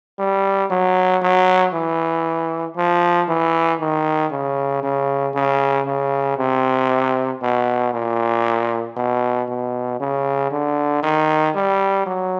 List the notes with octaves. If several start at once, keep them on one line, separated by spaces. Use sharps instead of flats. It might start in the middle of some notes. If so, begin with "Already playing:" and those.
G3
F#3
F#3
E3
F3
E3
D#3
C#3
C#3
C#3
C#3
C3
B2
A#2
B2
B2
C#3
D3
D#3
G3
F#3